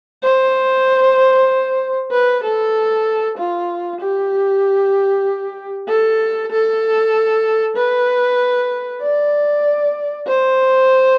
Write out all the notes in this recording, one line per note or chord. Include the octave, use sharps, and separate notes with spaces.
C5
B4
A4
F4
G4
A4
A4
B4
D5
C5